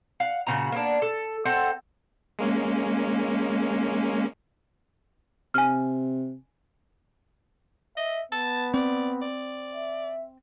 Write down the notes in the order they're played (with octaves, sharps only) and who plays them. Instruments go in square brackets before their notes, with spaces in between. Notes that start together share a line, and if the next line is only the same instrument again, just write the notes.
[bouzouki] F5 F#5
A#2 C#3 F#4 A#5
A#3 B3 D4
A4
C4 A4 D#5 F#5
[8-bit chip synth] G#3 A#3 C#4
[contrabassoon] C3 [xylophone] G#5 F6
[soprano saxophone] D#5 [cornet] E5
[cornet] B3 [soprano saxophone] A5
[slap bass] C4 [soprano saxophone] D5
[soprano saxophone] D5
[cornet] E5